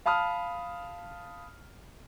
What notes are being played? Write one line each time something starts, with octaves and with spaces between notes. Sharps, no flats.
F5 A5 B5 D#6 F6